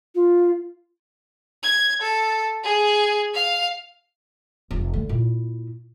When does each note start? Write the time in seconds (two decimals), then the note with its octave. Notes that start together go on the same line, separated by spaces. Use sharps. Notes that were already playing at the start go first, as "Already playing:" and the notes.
0.15 F4
1.63 G#6
2.02 A4
2.64 G#4
3.34 F5
4.71 F1
4.94 D3 A3
5.09 A#2 E4